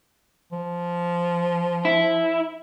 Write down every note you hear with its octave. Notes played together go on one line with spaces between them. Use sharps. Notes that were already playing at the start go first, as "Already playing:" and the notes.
F3
E4